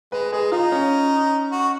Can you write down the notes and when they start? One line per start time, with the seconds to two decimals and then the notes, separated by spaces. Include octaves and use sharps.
0.12 G#3 B4
0.32 G#3 G#4
0.51 D#4 F4
0.72 C#4
1.52 F#4